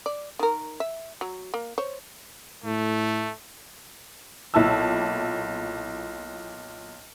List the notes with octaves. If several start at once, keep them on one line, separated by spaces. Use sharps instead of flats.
D5
D#3 A#4
E5
F#3
A#3
C5 C#5
A2 A3
B1 A#2 E4 A5 E6